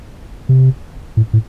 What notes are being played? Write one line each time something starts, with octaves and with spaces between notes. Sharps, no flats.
C3
A2
A2